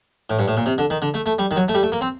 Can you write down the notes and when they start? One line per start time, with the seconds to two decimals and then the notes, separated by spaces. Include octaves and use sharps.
0.30 A2
0.39 G2
0.48 A2
0.57 A#2
0.66 C3
0.78 D3
0.90 D#3
1.02 D3
1.14 A3
1.26 A3
1.39 G3
1.51 D#3
1.56 F#3
1.68 A3
1.74 G3
1.83 A3
1.92 A#3
2.01 C4